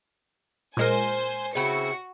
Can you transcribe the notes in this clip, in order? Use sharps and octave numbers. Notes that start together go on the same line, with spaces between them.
A#2 G#3 A#4 C5 G#5
C#3 C4 E4 F#4 C#7